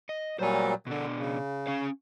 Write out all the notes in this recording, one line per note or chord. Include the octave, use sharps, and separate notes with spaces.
D#5
A#2 F#3 G3 C5 G#5
B2 D3 D4
C#3
C#4 F5